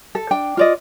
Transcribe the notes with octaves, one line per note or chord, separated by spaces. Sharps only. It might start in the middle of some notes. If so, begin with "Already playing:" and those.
A4
D4 G5
F4 D5 D#5